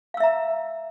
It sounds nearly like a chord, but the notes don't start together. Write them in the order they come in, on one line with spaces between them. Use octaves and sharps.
F5 E6 E5 A#5